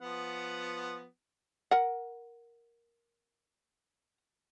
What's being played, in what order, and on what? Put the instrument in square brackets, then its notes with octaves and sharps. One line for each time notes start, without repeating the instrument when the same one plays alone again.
[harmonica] F3 B3 F#5
[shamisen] A#4 F#5